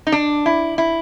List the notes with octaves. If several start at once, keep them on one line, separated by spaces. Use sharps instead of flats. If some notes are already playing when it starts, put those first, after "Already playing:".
D#4
D4
E4
E4